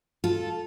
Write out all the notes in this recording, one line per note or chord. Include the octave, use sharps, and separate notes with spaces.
F4 A4